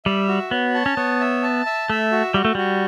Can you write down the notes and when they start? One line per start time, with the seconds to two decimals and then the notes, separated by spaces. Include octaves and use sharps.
0.05 G3 E5
0.28 F#4
0.51 B3 C#5
0.74 A5
0.86 C#4
0.97 B3 C#5
1.21 E5
1.43 A5
1.66 E5
1.90 A3 E5
2.12 F#4
2.34 G3 F#4
2.45 A3
2.55 G3 F#4